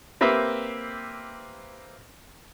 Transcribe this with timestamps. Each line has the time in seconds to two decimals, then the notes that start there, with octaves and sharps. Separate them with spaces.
0.21 A#3 C4 G4 B4 E5